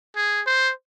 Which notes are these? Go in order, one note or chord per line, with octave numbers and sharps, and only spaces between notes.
G#4
C5